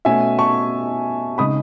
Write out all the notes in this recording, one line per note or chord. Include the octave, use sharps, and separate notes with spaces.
B2 A3 C#4 E5 G#5
A5 C#6
C#3 G#3 D#4 B5 D#6